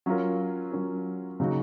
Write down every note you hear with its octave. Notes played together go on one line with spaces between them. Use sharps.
F#3 C#4 F4 A#4
F#3 C#4 F4 A#4
C#3 F#3 A#3 D#4 F#4